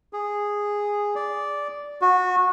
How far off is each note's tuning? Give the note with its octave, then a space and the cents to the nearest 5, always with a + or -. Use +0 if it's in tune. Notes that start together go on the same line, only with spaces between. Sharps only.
G#4 -10
D5 -10
F#4 -20